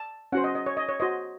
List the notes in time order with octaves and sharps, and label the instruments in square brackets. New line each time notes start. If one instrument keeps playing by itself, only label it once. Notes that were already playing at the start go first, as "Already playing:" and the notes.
Already playing: [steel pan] A5
C#4 F#4 C5 F#5
D#5
D#5
C#5
D#5
C#5
F#4 C5 D#5